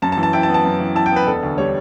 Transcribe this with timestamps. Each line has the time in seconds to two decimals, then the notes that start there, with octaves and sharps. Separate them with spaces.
0.02 F#2 A5
0.12 A5
0.17 E3
0.23 A5
0.33 E4 G5
0.43 A5
0.49 B3
0.54 A5
0.65 F#2
0.80 E3
0.95 E4 A5
1.06 G5
1.11 B3 B4
1.27 E1 A4
1.43 D2
1.58 G3 C#5